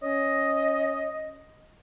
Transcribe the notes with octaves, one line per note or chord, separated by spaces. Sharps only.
C#4 D#5